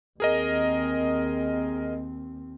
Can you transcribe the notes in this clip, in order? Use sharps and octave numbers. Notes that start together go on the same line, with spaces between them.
D#2 C4 G#4 A#4 D#5